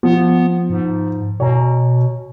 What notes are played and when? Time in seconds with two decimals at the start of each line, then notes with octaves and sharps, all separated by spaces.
0.03 F3 B3
0.70 G#2
1.40 B2 C#5 G#5 A#5